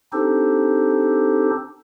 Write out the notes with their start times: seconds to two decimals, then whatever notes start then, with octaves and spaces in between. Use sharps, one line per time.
0.13 C4 D4 D#4 G4 A4 C5